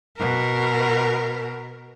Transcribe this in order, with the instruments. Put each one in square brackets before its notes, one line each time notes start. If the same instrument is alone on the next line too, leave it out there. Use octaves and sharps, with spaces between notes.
[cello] B2 A#4